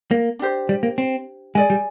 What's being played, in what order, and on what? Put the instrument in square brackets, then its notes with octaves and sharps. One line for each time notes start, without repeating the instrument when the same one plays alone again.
[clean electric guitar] A#3
[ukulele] D4 G4 C5
[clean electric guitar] G3
A#3
C4
[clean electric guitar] G#3 [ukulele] G#4 D5 G#5
[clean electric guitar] G3